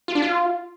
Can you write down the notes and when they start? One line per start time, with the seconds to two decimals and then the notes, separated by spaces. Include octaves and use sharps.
0.08 F4
0.15 D4
0.22 F4